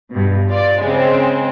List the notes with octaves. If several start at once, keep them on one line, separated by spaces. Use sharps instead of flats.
G2 B2
F4 D5
C#3 G#3 C4